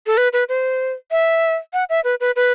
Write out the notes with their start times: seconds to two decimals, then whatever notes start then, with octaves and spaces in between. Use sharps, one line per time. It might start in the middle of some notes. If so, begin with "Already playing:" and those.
0.07 A4
0.17 B4
0.33 B4
0.49 C5
1.11 E5
1.73 F#5
1.90 E5
2.04 B4
2.20 B4
2.36 B4